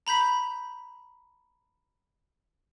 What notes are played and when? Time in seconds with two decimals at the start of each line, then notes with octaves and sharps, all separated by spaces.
0.07 A#5 B5 G6 B6